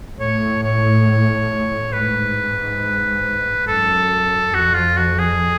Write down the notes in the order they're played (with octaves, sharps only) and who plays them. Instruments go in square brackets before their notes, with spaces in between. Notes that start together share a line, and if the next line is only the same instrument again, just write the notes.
[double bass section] A2 [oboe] C#5
[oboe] C#5
[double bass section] G#2 [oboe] B4
[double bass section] F#2 [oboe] A4
[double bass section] F2 [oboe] F#4
[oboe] F4
F#4
G#4